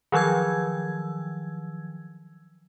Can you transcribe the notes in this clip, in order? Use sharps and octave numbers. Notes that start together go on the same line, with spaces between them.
D#3 F3 F#3 E6 G#6